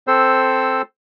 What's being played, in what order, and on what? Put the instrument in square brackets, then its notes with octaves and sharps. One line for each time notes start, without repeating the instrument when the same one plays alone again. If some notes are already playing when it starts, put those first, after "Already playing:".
[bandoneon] C4 A4 C5 E6